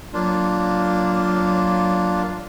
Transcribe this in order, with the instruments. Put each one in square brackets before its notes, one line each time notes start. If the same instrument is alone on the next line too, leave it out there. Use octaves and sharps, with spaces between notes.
[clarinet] F#3 [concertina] A#3 D4 F4